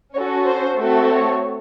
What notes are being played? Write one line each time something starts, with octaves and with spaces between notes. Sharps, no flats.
C#4 F#4 A4 C#5
C5
A3 C4 F#4 A4
C#5